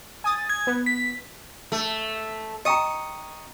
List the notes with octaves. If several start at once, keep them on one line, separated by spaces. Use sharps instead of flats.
G#5 D#6 A6
G#6
B3
B6
A3
D#5 G5 A#5 C#6 D#6